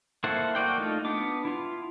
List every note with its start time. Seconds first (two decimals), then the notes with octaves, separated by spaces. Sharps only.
0.24 A#3 E4 A4 C5 F#5
0.55 A#3 F#4 D5 G5
0.78 A3 D#4 F4
1.05 B3 D4 D6
1.45 E4 F4